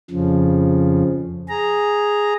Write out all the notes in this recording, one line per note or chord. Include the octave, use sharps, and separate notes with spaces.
F2 C#3 F3
G#4 A#5